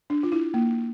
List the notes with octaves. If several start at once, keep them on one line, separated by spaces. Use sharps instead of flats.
D4
F4
E4
A#3